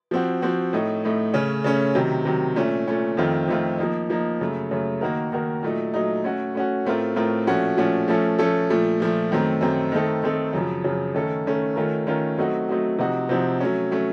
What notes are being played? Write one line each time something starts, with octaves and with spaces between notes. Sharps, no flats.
F3 C4 F#4
F3 C4 F#4
A2 A3 D#4
A2 A3 D#4
C#3 A3 C#4
C#3 A3 C#4
C3 D#3 F#3
C3 D#3 F#3
A#2 A3 C#4
A#2 A3 C#4
F2 D#3 A3 C4 F4
F2 D#3 A3 C4 F4
F3 A#3 D#4
F3 A#3 D#4
F#2 C#3 A3
F#2 C#3 A3
D#3 A#3 D#4 F#4 A#4
D#3 A#3 D#4 F#4 A#4
A#2 F#3 A3 D#4
A#2 F#3 A3 D#4
A3 C#4 F#4
A3 C#4 F#4
A2 A3 C4 F4 A#4
A2 A3 C4 F4 A#4
A#2 F3 A3 C#4 F#4
A#2 F3 A3 C#4 F#4
F3 A3 C#4 A4
F3 A3 C#4 A4
A#2 F3 A3
A#2 F3 A3
F#2 D#3 A3 C4
F#2 D#3 A3 C4
D#3 A3 C4 D#4 A4
D#3 A3 C4 D#4 A4
F#2 C#3 F3
F#2 C#3 F3
D#3 A3 C#4 A4
D#3 A3 C#4 A4
D#3 A3 C#4 F4 A#4
D#3 A3 C#4 F4 A#4
F#3 A3 C4 D#4 F#4
F#3 A3 C4 D#4 F#4
C3 F3 C4 D#4 F#4
C3 F3 C4 D#4 F#4
F#3 A3 C#4
F#3 A3 C#4